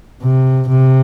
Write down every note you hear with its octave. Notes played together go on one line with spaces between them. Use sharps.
C3
C3